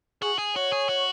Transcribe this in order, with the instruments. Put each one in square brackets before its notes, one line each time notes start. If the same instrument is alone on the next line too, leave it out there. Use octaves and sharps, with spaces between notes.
[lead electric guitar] F#4 [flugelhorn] G#4
[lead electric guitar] G#4
[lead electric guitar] F#4 [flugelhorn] C#5
[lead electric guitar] G#4
F#4